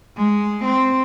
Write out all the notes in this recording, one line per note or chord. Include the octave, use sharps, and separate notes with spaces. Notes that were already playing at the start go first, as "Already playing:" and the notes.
G#3
C4